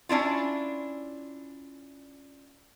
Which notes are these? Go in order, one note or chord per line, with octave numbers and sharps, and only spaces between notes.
C#4 D4 E4 F4